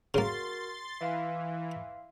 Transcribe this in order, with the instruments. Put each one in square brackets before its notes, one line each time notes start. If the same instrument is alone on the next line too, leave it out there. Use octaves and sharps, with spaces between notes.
[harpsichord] C#3 A#3 [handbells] F#4 A#4 [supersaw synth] C6 A6
[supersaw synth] E3 [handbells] E5 F5 C6